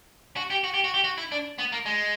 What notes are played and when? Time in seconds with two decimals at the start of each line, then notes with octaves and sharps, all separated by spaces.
0.36 F#4
0.50 G4
0.64 F#4
0.74 G4
0.84 F#4
0.94 G4
1.04 F#4
1.18 E4
1.32 D4
1.58 B3
1.72 A#3
1.86 G#3